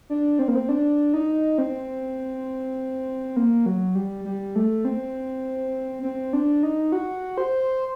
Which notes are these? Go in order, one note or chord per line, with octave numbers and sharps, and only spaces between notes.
D4
C4
A#3
C4
D4
D#4
C4
A#3
F#3
G3
G3
A3
C4
C4
D4
D#4
F#4
C5